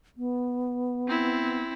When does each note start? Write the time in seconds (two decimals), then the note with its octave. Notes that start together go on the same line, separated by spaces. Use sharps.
0.17 B3
1.07 C4 E4